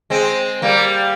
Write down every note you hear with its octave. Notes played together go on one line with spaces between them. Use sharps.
G#3 C4
G3 A#3